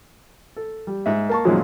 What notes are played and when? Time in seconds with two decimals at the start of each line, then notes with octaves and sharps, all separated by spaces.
0.56 A4
0.87 G3
1.06 G#2 E5
1.29 A#3 A5 C#6
1.45 F#2 A#2 D#3 F3 F#3 G#3